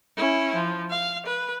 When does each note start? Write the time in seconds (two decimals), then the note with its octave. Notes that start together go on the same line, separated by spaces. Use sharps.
0.17 C#4 E4
0.55 F3
0.90 F5
1.26 B4